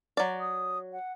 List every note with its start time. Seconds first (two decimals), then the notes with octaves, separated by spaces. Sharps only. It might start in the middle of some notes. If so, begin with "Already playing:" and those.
0.17 F#3 D5
0.40 D#6
0.92 F#5